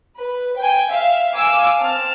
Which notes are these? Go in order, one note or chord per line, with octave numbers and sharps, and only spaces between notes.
B4
G5 G#5
E5 F5
F5 G#5 D6 E6
C4 A5 F6